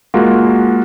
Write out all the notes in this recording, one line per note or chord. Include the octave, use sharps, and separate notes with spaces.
G#3 A#3 F4 F#4